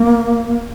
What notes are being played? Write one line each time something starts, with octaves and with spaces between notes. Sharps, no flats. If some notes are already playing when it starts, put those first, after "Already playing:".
Already playing: A#3